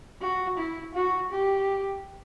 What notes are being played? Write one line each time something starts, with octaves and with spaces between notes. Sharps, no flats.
F#4
E4
F#4
G4